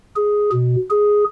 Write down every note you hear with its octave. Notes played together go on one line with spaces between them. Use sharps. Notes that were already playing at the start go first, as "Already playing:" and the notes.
G#4
B2
G#4